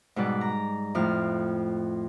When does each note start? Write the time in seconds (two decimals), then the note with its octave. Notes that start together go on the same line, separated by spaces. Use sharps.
0.16 G#2 B2 G3 B4 D5
0.41 A#5
0.95 F2 A2 F6